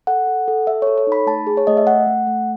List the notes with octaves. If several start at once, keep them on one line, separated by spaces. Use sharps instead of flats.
A4 F#5
A4
A4
A4 E5
A4 C#5
C#5
D#4 B5
A3 A5
G#4
C#5
A3 D#5
E5
A3 F#5
A3
A3